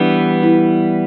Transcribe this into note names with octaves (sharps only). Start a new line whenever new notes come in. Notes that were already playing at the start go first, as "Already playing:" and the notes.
Already playing: E3 G3 B3 D4
E4